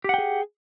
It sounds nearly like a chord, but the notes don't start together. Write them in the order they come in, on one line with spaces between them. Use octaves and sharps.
G4 F#5 G5 G#4